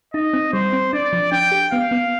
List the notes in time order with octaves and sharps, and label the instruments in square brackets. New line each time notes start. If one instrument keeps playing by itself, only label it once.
[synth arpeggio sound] D#4 [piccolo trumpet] D#5
[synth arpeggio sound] C4
[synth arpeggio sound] G3 [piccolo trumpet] C5
[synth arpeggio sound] C4
[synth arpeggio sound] D4 [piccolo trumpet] D5
[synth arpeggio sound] F3
[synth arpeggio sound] D4 [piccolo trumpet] G5
[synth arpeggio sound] G4
[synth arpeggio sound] B3 [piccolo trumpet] F5
[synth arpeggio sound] B3